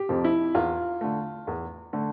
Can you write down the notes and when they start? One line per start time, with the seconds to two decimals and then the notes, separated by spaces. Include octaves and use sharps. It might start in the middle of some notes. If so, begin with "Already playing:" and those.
Already playing: G4
0.09 F2 C3 F3
0.25 E4
0.54 E2 F4
1.01 D3 A3
1.47 E2
1.93 D3 A3